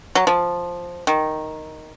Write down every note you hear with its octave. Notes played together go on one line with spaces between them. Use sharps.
F#3
F3
D#3